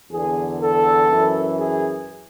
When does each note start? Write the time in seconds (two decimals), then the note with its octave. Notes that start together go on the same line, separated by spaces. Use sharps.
0.11 E2 D3 G#4
0.60 A4
1.10 F#2 E3
1.59 G#4